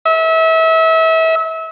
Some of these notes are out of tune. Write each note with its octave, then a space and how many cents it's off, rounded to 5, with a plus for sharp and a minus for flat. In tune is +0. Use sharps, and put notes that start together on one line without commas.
E5 -30